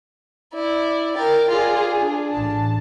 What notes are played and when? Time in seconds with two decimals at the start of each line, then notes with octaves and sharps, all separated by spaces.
0.53 E4 D5
1.16 A#4 G5 A6
1.49 F4 G#4 D5
2.00 D4
2.31 A1 A5